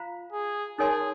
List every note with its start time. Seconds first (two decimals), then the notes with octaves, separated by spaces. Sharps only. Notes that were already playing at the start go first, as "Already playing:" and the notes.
Already playing: F4 C5 F5 A#5
0.32 G#4
0.78 D#4 G#4 A#4 C#5 G#5 C6